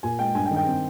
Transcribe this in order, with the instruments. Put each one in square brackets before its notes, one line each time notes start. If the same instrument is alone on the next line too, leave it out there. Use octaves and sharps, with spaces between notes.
[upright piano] A#2 G#5
G#3 G5
G2 G#5
G5
D#3
G5
C4